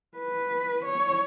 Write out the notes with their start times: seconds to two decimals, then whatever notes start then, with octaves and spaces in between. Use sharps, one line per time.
0.18 B4
0.85 C#5